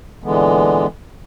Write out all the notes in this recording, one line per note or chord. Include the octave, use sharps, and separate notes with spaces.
A#2 D3 E3 G#3 B3